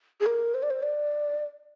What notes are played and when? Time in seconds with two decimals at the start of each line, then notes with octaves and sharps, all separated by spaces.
0.20 G#4
0.26 A#4
0.54 C5
0.63 D5
0.70 C5
0.82 D5